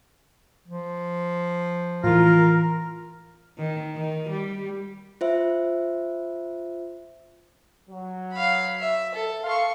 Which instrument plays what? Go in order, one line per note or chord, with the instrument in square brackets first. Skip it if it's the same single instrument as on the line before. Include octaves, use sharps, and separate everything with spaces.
[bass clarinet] F3
[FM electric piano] A2 E3 [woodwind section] F4 A#4
[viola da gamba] D#3
D#3
G3
[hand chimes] F4 C5 E5
[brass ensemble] F#3
[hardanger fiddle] F5 B5
E5
A4
[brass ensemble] A4 F5 [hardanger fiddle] C6 C#6